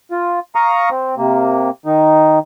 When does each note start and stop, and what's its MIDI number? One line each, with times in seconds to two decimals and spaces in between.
0.11 0.39 65
0.55 0.89 77
0.55 0.89 82
0.55 0.89 85
0.55 0.89 87
0.91 1.15 60
1.18 1.70 48
1.18 1.70 58
1.86 2.39 51
1.86 2.39 63